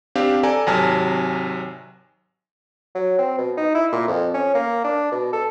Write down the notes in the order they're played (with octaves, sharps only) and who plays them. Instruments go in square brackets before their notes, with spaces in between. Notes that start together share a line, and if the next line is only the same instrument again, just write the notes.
[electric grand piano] C4 D4 G4 F5
A4 D5 G#5 A#5
G#1 C3 F#3 G#5 A5 F6
[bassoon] F#3
C4
B2
D#4
E4
A#2
F2
C#4
A#3
D4
B2
A4